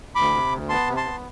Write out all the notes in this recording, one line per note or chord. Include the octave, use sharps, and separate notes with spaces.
D2 B5 D6
C3
D2
B3 A5 C6
C3
A5 C6
B3